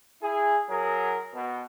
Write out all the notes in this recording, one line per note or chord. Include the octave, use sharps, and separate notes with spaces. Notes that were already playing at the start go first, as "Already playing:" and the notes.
E4 G#4
F#3 G#4 A#4
B2